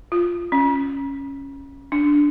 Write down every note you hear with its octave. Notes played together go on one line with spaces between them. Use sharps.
F4
C#4
D4